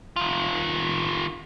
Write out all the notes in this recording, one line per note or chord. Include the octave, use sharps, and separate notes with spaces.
D#3 F4